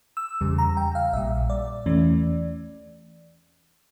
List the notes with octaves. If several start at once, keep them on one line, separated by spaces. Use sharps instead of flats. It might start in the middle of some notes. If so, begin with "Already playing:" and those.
E6
E2 C#3 G3
A#5
G5
F5
A#1 A#2 G3 E5
D5
E2 E3 A3 C#4